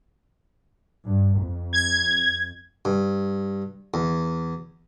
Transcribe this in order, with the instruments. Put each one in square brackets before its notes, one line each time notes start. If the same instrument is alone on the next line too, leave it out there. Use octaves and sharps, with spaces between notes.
[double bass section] G2
F2
[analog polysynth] G#6
[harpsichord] G2
E2